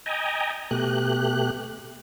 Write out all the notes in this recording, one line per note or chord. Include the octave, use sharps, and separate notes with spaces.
D#5 G5 G#5 A#5
B2 A3 G4 F#6